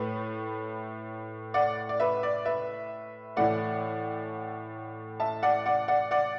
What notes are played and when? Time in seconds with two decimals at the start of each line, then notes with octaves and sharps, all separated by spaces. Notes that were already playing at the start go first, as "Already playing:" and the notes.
Already playing: A2 A3 B4
1.54 D5 F#5
1.89 D5
2.00 B4 E5
2.23 D5
2.46 B4 E5
3.36 A2 E3 A3 D5 F#5
5.20 E5 A5
5.43 D5 F#5
5.66 D5 F#5
5.88 D5 F#5
6.11 D5 F#5